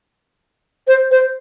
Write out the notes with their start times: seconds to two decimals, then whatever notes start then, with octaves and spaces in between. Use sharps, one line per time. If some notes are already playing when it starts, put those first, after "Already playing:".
0.88 C5
1.11 C5